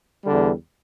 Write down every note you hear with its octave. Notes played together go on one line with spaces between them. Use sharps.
E2 D3 G3